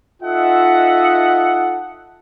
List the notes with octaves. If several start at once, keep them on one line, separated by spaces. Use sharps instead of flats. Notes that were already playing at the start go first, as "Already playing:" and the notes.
D#4 F4 A4 D#5 E5 F#5